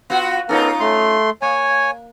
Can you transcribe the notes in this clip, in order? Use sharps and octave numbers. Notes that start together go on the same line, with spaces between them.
B3 F4 F#4
B3 C#4 D#4 F4 A4 A#4
A3 C6
A#3 C#5 G#5